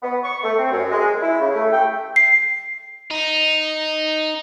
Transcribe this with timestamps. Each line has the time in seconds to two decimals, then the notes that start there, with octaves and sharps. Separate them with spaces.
0.03 B3
0.24 C#6
0.43 A3
0.59 C4
0.72 F#2
0.92 G#3
1.22 E4
1.40 C#3
1.54 A3
1.72 G5
2.16 C7
3.11 D#4